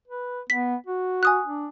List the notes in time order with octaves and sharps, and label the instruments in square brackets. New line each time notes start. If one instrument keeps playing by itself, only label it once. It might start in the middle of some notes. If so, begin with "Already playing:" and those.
[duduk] B4
[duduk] B3 [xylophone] B6
[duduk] F#4
[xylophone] G#5 D#6 F#6
[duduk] D4